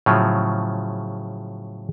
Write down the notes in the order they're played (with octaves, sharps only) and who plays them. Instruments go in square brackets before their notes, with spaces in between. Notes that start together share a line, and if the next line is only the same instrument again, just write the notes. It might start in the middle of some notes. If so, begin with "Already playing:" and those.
[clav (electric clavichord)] A2 C#3 F3 F#3